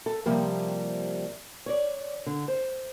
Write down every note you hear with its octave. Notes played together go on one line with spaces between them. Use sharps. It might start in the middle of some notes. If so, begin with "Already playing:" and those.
A4
C3 F3 G3 A#3
C#5 D5
D3
C5